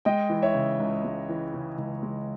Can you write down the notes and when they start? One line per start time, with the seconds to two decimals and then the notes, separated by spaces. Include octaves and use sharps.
0.05 G#3 D#5 G5
0.30 E3
0.42 C#5 E5
0.54 C#3
0.80 C#2
1.04 G#3
1.29 E3
1.54 C#3
1.78 C#2
2.03 G#3